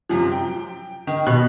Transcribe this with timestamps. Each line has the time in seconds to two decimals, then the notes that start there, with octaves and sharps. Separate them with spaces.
0.09 F#2 C3 F3
0.32 G5
1.07 D#3
1.27 B2 F#6